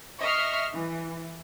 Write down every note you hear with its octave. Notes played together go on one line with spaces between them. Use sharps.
D#5 E5 C#6 F6 C7
E3